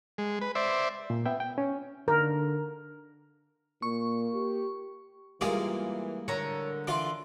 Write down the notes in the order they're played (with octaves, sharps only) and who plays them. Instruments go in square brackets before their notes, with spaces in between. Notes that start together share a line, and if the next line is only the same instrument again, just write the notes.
[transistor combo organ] G#3
B4
C5 D5 E5
[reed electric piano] A#2
B3 E5 G5
G5
C#4
[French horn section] D3 [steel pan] A#4
[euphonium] A#2 [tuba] A#3 [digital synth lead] C#6
[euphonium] G4
[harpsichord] G2 G#3 F5 [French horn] E3 [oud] A#3 F4 G#4 [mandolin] D6
[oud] D3 [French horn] A#4 [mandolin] C#5 A#5
[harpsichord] E3 F4 [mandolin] D5 C6